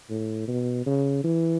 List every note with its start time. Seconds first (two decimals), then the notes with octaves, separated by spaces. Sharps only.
0.10 A2
0.48 B2
0.86 C#3
1.24 E3